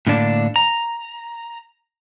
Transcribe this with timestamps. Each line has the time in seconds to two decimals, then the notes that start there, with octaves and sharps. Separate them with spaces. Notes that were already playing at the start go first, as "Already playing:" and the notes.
0.07 A2 D3 A#3 D4
0.56 A#5